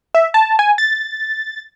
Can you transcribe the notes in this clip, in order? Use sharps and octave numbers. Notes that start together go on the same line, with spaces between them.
E5
A5
G#5
A6